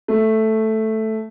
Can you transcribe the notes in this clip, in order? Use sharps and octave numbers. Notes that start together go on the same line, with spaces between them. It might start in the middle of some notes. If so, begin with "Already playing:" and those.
A3